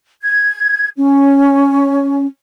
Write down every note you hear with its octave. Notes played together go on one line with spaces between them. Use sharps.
G#6
C#4